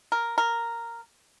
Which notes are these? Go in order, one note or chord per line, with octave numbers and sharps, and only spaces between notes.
A#4
A#4